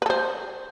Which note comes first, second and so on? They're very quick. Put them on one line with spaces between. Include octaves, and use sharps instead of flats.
B4 A4 C5